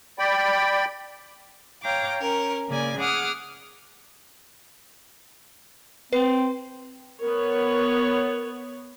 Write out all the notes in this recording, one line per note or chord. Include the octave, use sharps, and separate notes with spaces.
D5 G5 B5
C#5 F5 G5 A#5 D6
C#4 A#4
C#3 A#3 D5 G#5
G#4 F#5 D6 D#6 F6
C4 B4 C7
B3 A#4 C#5